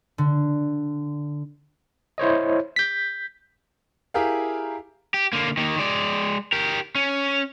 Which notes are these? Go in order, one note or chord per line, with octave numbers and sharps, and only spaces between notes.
D3
E4 C5 C#5 D#5
G6 B6
E4 G4 G#4 A#4 F5
G4
D3 A#3
D#3 A#3
G#3 D5
G4 A#4
C#4